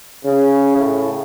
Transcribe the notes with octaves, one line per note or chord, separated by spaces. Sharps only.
C#3
A2